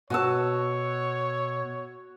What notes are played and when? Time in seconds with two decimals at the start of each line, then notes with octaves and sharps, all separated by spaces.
0.10 B2 F#4 C#5 G#5 A5 E6